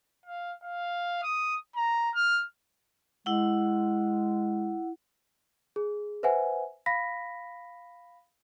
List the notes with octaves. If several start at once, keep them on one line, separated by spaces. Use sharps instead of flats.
F5
F5
D#6
A#5
F6
G#3 E4 F#5
G#4
B4 C5 E5 F#5 G#5
F5 B5 A#6 B6